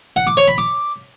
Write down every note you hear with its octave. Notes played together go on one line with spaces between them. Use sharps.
F#5
D6
C#5
B5
D6